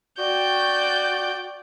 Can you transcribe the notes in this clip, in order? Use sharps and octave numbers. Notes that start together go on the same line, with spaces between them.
F#4 D5 G5 G6